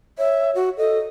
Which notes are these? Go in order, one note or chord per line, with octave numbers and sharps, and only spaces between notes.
C#5 E5
F#4
A4 D#5